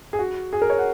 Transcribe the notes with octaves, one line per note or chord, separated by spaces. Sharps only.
G#4
F#4
G#4
A#4
C#5
F#5